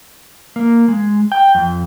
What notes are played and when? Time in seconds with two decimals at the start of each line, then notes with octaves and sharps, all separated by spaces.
0.56 A#3
0.88 G#3
1.32 G5
1.55 F2